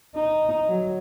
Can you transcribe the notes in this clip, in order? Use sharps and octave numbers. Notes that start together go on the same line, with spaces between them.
D#4
F#3